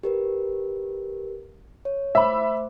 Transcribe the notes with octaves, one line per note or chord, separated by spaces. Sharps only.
G4 A#4 B4
C#5
A3 C5 E5 B5 D6